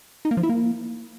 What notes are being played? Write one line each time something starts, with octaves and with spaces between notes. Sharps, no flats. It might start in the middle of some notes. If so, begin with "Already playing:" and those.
D#4
A#3
F3
E4
A#3